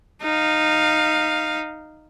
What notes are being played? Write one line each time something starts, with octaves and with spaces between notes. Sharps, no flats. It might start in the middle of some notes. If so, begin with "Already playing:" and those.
D#4 F5